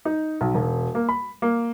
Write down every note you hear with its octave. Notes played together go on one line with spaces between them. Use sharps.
D#4
B1
E1
A#3
B5
A#3